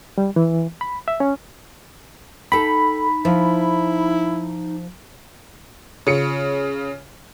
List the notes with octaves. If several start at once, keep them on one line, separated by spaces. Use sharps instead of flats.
G3
E3
B5
E5
C#4
D#4 A4 G5 B5
F3 E4
C#3 F4 C#7